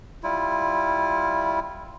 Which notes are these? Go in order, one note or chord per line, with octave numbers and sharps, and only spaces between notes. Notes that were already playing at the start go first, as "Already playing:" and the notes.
G3 E4 F4